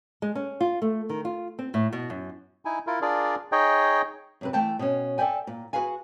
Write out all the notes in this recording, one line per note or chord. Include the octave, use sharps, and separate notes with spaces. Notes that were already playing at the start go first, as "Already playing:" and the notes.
G#3
C#4
F4
A3
D#3
F4
C4
A2
B2
F#2
D#4 E4 G#5
E4 F4 A#4
D4 F4 G#4 A#4 D5
D#4 G#4 C#5 D#5 G5
F#2 C3 B4
E3 A3 G5 A5
B2 C#4
A4 D5 E5 G5 G#5
A#2
F#4 G#4 B4 F5 G#5